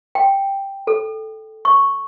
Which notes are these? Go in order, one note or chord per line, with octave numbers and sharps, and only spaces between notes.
G5
A4
C#6